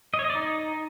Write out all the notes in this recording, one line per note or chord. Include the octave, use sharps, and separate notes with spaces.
D#5
C#5
D#5
D5
D#4